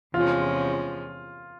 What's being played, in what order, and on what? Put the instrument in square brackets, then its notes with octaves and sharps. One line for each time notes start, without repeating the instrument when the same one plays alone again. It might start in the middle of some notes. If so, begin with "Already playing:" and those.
[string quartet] E2 C3 F3 G#3 C#4 [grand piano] F4